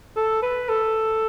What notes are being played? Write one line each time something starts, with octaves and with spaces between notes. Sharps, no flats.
A4
B4
A4